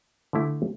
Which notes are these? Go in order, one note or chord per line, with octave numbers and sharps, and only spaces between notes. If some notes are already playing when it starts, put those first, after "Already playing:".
D3 A3 E4